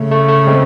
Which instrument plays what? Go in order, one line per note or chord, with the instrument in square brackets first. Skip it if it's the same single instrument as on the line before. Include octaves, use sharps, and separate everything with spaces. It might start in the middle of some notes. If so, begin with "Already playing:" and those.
Already playing: [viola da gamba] C#3 [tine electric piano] A3
[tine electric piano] A3
A3
G#3 C4